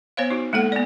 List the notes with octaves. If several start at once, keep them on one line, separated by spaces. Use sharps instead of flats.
B3 C5 C#5 F5
D#4 F#4
G#3 A#3 A4 F#5
B3 D5